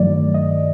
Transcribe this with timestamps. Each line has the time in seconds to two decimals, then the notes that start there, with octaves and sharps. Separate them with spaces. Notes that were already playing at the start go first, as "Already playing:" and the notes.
Already playing: G2 D#3 F#3 A3 D5
0.34 D#5